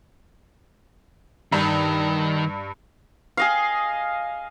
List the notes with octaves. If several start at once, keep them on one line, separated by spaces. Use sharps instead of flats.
G2 D#3
G#4 D#5 F5